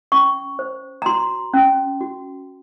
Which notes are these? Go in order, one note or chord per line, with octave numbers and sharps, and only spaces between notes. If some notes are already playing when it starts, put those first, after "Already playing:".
C#4 C#6
C5
A#5
F#4 C6
C#4
F#4